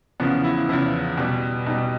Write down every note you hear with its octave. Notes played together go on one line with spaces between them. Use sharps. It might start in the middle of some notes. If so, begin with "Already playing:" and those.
E2 C#3 F3 B3
E4
E2 C#3 F3 E4
B2 G3
B2 G3 D#4